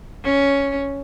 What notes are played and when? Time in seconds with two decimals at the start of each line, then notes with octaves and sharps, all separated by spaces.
0.25 C#4